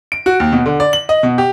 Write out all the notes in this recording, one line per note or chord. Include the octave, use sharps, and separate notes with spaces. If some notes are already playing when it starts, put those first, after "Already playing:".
D7
F#4
D#2
B2
D3
D5
F#7
D#5
B2
G4